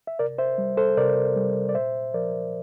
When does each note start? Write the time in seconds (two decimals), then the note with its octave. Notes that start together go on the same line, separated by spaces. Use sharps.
0.07 E5
0.19 C3 A#4 D5
0.38 C5 E5
0.58 G3
0.77 A4 C5
0.97 C3 A#4 D5
1.36 G3
1.69 D5
1.75 A#2 C5 E5
2.14 F3 A#4 D5